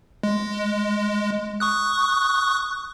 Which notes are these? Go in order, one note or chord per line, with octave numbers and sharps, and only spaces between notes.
G#3
C#6 D#6 F#6